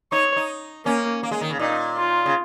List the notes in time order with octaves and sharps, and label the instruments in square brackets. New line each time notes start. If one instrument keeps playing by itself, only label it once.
[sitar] D#4 [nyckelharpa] C#5
[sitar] D#4
[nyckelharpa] A#3 [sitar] C#4
[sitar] A#3
G#3
D#3
C#3
[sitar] A#2 [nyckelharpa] D#4
[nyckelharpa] F4
[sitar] C#3